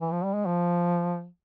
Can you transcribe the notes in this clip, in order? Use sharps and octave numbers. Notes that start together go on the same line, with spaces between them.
E3
F3
G3
G#3
F3